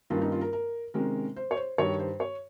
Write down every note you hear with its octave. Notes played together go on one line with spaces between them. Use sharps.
G2 D#3 A#3 C#4 F4
D#4
F4
A#4
A#4
C3 D#3 G#3 C#4 A#4
C5
C#5
C5
G2 D#3 G3 C#5
C5
C#5